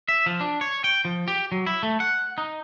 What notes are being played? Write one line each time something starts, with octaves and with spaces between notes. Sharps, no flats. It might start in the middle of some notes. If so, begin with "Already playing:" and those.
E5
F3
D4
C#5
G5
F3
G4
F#3
E4
A3
F#5
D#4